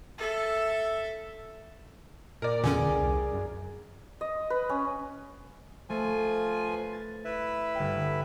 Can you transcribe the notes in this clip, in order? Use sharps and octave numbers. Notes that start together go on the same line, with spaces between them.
A4 E5
A#2 A#4 D5
E2 A#2 D3 C#4 G#4
C2
F#2
D#5
B4
C#4
F3 A3 F4 G#5
B4
A6
E4 B4 E5
G1 F5 G5